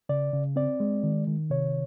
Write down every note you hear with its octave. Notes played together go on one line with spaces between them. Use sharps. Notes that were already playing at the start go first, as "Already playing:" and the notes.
C#3 D5
C#3
C4 D5
G#3
D#3
D#3
C3 C#5